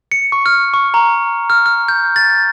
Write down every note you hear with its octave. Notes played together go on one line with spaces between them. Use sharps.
C#7
C#6
F6
C#6
A#5
F6
F6
G6
A6